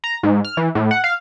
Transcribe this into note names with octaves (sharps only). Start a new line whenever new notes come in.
A#5
G#2
F6
E3
A2
F#5
F5